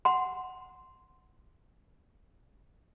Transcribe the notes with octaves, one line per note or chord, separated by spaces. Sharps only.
F#5 C6